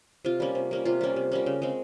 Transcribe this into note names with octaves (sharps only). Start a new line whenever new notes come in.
C3 F4
G3 A#3 C#4
C3
G3 A#3 C#4
C3 F4
G3 A#3 C#4
C3
G3 A#3 C#4
C#3
G#3 C4